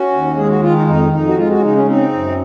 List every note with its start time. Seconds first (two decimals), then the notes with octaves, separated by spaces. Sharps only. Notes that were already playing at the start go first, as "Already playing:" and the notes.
Already playing: C#4 F#4
0.11 D#2
0.36 G#3 G#4
0.49 F#4
0.62 D#3 F4
0.74 D#4
0.87 F2 D#4
1.12 F2 D#4
1.27 F#4
1.37 G#3 F4
1.50 F#4
1.58 C#4
1.62 C#3 D#4
1.75 C#4
1.88 C4 D#4
2.13 F#2